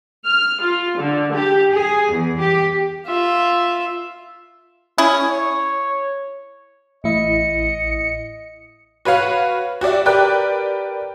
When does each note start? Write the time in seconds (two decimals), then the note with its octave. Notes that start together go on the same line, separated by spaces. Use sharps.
0.25 F6
0.61 F4
0.97 D3
1.32 G4
1.72 G#4
2.11 E2
2.39 G4
3.06 F4 E5
4.98 C#4 E4 G#4
5.30 C#5
7.04 A1 A2 E4 D#5 C#7
9.05 F#4 B4 C#5 F5 F#5
9.81 F#4 G4 D5 E5
10.06 G4 A#4 B4 D5 G5 F#6